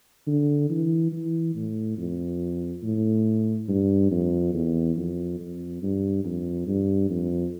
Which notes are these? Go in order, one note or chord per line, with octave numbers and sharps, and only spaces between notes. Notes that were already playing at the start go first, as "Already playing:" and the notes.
D3
E3
E3
A2
F2
A2
G2
F2
E2
F2
F2
G2
F2
G2
F2